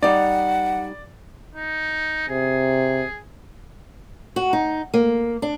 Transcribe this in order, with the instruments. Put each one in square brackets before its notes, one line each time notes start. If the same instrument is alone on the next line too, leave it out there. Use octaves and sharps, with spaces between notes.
[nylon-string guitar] G3 D#4 [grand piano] D5 [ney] F#5
[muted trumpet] D#4
[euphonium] C3 [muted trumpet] G#4
[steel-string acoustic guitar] F#4
D#4
A#3
D4